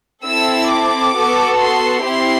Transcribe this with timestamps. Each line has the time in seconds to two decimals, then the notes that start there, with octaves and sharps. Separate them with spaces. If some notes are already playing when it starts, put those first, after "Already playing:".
0.25 C4 E4 A4 E6
0.70 D6
1.16 B3 F#4 A4
1.60 C6
2.05 C4 E4 G4 C6